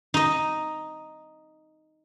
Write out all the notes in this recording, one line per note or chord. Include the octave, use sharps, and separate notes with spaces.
D#4 D#5